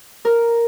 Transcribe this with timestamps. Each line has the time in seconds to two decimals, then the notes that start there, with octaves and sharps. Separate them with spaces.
0.25 A#4